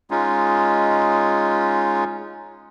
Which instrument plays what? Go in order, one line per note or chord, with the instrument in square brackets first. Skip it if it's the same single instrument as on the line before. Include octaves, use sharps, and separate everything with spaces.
[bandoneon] G#3 C#4 D#4 F4